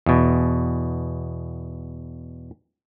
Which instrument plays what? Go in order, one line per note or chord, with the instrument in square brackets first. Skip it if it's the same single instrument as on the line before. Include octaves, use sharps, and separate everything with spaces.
[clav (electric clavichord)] E2 B2